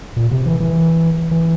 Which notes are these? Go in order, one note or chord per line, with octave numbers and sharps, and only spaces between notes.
A#2
C3
E3
E3
E3